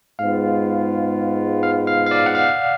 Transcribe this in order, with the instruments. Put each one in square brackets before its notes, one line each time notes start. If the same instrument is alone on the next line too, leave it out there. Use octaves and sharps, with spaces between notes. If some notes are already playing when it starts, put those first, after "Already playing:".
[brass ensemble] G#2 G#3 B3 F4 [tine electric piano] F5
[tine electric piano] F5
F5
F5
D5
F#5
F5